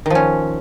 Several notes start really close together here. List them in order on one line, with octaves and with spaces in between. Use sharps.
D#3 F3 C#4